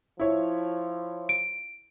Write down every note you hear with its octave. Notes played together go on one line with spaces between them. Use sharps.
F3 E4 C#5
D7